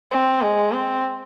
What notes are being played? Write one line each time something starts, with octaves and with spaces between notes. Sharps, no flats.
C4
G#3
C4